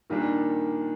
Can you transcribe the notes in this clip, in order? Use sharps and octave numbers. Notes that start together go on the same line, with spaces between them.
A#2 D#3 G3 D4